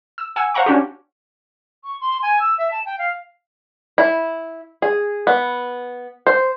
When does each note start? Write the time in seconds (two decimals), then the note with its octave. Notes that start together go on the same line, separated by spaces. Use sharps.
0.18 E6
0.36 F#5 G#5 E6
0.54 C5 F5 F#5 A#5 C#6
0.66 C#4 D4 F#4 G4
1.84 C#6
2.01 C6
2.22 G#5
2.40 E6
2.58 E5
2.71 A5
2.86 G5
2.99 F5
3.98 E4
4.82 G#4
5.27 B3
6.27 C5